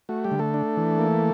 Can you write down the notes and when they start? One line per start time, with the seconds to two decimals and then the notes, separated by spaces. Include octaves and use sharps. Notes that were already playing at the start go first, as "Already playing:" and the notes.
0.09 A3 F#4
0.24 G3 G4
0.31 D3
0.39 A3 A4
0.54 D4
0.77 E3
0.99 A#3